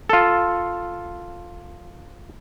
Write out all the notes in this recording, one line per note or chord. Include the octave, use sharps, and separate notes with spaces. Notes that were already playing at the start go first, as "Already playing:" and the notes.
F4 A4